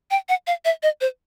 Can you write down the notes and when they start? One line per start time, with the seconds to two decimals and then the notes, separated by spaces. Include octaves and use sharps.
0.11 G5
0.29 F#5
0.47 F5
0.65 E5
0.83 D#5
1.01 C5